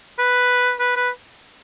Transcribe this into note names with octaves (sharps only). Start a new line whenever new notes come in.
B4
B4
B4